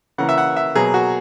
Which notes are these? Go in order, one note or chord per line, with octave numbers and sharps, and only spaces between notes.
C#3 E3 A#3 F#5
E5
F#5
E5
B2 F#3 A#3 G#4
F#4